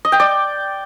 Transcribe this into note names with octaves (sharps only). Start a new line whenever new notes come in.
D#5
G5
D5